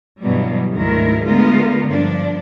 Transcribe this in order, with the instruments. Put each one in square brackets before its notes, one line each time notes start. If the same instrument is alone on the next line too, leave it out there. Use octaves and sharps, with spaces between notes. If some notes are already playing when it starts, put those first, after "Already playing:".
[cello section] G2 B2 E3 F#3 G3
D2 G#2 D#3 E4 A#4
D3 G#3 A3 B3 F4 A#4
G2 F3 D4